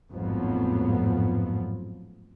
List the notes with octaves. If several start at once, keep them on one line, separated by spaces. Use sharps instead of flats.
A1 F2 G#2 F3 F#3 B3